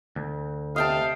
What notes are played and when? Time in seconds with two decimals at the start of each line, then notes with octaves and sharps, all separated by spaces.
0.16 D2
0.76 C3 D#5 F5 G5 A5